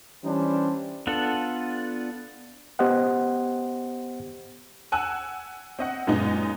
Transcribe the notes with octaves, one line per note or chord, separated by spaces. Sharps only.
E3 G3 C#4 D4 E4 C5
B3 D4 F4 A4 F#5
B3 G4 C5 D#5 F#5
F#5 G#5 E6 F#6
C4 D#5 F#5
F#2 A#2 G#3 B3 D#4